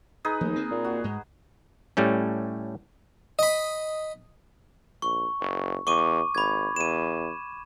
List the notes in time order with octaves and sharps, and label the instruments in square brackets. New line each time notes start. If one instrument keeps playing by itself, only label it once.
[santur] D#4 G#4 B4
[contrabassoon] D#2 [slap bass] F3 A3
[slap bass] A#3 C4
[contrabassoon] A#2
[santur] F#4
[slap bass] G#2 G#3
[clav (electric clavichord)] A2 G3 A3 C#4
[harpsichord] D#5 B5
[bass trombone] A#1 [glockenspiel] C#6
[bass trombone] F#1
[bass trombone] E2 [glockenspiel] C#6 D6 D#7
[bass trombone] G#1 [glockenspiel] B5 G#6
[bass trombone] E2 [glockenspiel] D#7 E7